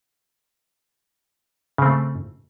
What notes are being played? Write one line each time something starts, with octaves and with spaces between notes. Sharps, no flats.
C#3 A3 C4